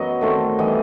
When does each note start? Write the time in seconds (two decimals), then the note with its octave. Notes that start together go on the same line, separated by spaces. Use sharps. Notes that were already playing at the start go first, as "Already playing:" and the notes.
Already playing: F#2 F#3 B3 D#5
0.21 D#3 A3 C4
0.58 E3 G3 B3 D#5